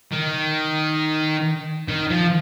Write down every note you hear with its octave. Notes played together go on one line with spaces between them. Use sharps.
D#3
D#3
F3